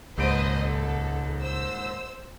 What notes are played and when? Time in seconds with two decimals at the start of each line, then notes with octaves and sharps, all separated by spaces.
0.18 D#1 C#2 G#2 B4 C5 D#5 D7
0.62 A4
1.40 C5 E6